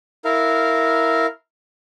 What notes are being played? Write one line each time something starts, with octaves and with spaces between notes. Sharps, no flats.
E4 A#4 F5